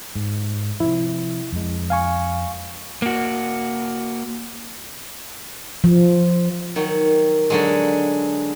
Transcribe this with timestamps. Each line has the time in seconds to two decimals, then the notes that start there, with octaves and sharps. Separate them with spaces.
0.15 G#2
0.80 C3 F3 E4
1.53 F2 G#3
1.90 F5 G#5 C#6
3.02 A#3 F#4
5.84 F3
6.76 D#3 F#3
7.50 D3 F#3 G#3